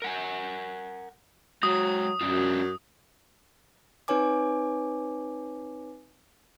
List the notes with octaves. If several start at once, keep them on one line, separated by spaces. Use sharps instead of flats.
A#4 F#5 G#5
F#3 G#3 F#4 D#6
F#2 C#4 D4 F4
C4 D#4 B4 C#5 G#5 D6